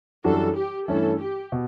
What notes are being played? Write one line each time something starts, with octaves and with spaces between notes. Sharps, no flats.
F#2 E3 G3 D4 F#4 A4
G4
G2 E3 A3 C#4 A4
G4
B2